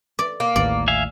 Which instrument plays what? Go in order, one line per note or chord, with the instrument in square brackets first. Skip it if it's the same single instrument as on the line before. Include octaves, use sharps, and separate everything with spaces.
[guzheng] D5
[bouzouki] A#3
[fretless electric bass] A1 D#2 A2 [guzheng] D5
[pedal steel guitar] E5 F5 G#5